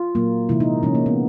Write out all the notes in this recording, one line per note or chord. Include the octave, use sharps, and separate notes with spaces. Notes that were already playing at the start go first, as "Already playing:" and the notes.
Already playing: F4
A#2 F#3 A#3
C3 E3 G#3 E4
D#4
C3 E3 G#3 C#4
A#3
B3